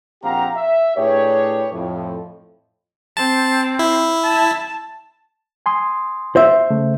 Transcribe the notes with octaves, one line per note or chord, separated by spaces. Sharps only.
A#1 C4 G4 F5 F#5 A#5
E5
A2 D4 G4 G#4 B4 C#5
F2 A2
C4 A5
E4
A5
G#5 C6 D#6
C5 E5
C#3 A3